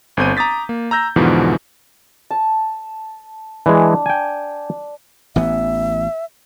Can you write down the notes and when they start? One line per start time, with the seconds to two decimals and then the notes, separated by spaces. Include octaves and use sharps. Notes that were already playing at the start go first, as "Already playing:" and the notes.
0.17 G1 C4 G6 D#7
0.37 A#5 D6 D#6 A6 B6
0.69 A#3
0.91 A#5 E6 G6 A#6
1.16 E2 G#2 B2 D3 E3 F3
2.31 A5
3.66 E3 G#3 D4
4.06 G5 G#5
5.36 A1 E3 B3 E5